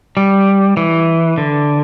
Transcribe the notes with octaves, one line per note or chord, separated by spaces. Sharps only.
G3
E3
D3